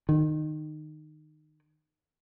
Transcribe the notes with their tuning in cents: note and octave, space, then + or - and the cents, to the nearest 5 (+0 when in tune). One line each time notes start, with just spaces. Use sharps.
D#3 -20